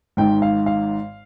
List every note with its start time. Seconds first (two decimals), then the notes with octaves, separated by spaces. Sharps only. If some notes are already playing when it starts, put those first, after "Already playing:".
0.17 G#1 G#2 D#3 G5
0.42 F5
0.66 F5